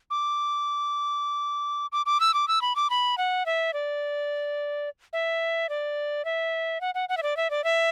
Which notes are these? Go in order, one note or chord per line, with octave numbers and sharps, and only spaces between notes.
D6
D6
D6
E6
D6
E6
B5
D6
B5
F#5
E5
D5
E5
D5
E5
F#5
F#5
F#5
E5
D5
E5
D5
E5